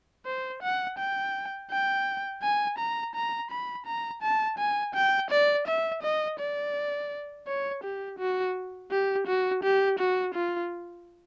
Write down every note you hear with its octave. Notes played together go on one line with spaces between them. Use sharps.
C5
F#5
G5
G5
G#5
A#5
A#5
B5
A#5
A5
G#5
G5
D5
E5
D#5
D5
C#5
G4
F#4
G4
F#4
G4
F#4
F4